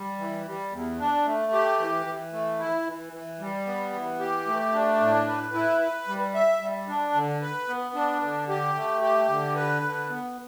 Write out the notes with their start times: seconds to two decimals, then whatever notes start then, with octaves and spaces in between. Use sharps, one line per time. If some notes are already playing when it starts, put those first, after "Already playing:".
Already playing: G3
0.19 E3
0.46 G3
0.72 E2
0.99 D4
1.26 A3
1.53 G4
1.80 E3
2.06 E3
2.33 A3
2.59 E4
2.86 E3
3.13 E3
3.40 G3
3.67 B3
3.93 E3
4.20 G4
4.47 A3
4.74 D4
5.00 A2
5.28 B4
5.54 E4
5.81 B4
6.08 G3
6.34 E5
6.61 G3
6.88 D4
7.15 D3
7.42 B4
7.68 B3
7.95 D4
8.22 D3
8.49 G4
8.75 A3
9.02 G4
9.29 D3
9.56 B4
9.83 D3
10.09 B3